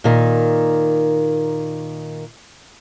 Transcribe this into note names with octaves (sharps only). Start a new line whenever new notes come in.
A#2 D#3